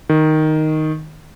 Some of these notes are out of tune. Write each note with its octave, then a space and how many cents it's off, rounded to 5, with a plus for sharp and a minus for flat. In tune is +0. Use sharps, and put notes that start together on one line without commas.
D#3 +0